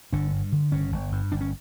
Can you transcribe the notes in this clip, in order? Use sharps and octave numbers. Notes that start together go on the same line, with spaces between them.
G1 D3 D4
G2
D3
G1 C#3 C#4
G1
G2
G1 D4
C#4